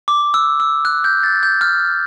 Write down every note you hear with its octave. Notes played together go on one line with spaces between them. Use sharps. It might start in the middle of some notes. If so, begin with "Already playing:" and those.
D6
E6
E6
F#6
G6
A6
G6
F6